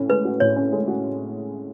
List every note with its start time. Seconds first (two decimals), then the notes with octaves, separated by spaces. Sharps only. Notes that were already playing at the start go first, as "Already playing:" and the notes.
Already playing: A2 C#4
0.09 G#3 B4
0.25 F#4
0.40 A2 C#5
0.56 C#4
0.72 G#3
0.88 F#4